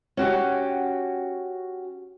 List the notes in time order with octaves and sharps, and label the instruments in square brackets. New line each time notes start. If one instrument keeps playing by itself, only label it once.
[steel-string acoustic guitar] C#4 F#4 G4